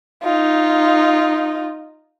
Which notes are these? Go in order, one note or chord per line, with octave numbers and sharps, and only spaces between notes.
D#4 F4